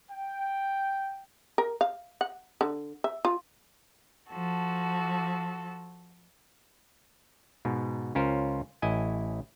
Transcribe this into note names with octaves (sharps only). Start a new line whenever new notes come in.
G5
A#4
F5
F#5
D3
E5
F4
F3 F#4 A4
G#2 B2
C#2 C#4 F4 A#4 C5
A1 E4 D#5 G#5